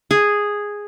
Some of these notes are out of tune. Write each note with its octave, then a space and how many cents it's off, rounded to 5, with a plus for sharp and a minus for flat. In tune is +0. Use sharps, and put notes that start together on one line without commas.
G#4 -5